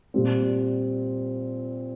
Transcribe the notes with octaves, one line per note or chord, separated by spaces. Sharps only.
A#2 G3 C4